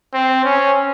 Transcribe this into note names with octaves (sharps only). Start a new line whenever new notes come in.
C4
C#4